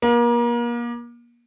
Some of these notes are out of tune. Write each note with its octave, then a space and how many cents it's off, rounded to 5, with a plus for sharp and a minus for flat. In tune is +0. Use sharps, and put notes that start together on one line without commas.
A#3 +35